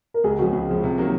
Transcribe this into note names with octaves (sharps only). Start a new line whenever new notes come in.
A#4
C#2 G#4
C#3 F3 F#4
C#2 F4
C#3 F3
C3
D#3 F#3 A#3